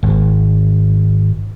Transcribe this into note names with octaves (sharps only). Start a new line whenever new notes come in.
G#1